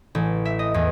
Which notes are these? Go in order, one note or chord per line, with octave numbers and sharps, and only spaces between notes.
A1
E5
D#5
E2